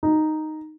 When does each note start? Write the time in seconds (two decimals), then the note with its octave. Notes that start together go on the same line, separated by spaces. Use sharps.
0.03 D#4